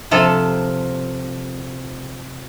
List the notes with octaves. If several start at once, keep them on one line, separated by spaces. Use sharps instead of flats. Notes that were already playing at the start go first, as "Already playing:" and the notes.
C3 F3 A4